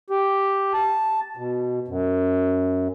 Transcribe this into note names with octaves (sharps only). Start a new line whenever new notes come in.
G4
A5
B2
F#2